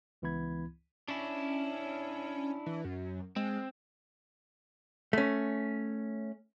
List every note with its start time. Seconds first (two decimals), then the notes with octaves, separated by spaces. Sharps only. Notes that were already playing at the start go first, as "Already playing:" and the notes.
0.22 C#2 E3 B3 E4 B5 G#6
1.08 C#4 D4 E4
2.66 E3
2.84 F#2
3.36 G#3 C4
5.13 A3 C#4